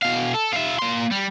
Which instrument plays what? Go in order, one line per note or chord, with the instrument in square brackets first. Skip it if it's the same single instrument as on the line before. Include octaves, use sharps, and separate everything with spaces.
[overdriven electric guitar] B2 F5
A4
F4 E5
A#3 C6
G3